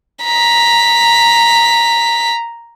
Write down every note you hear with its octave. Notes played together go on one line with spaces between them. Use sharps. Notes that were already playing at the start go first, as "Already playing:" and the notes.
A#5 B6